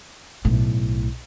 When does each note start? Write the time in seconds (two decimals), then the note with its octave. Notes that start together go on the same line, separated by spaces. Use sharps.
0.45 B1 A2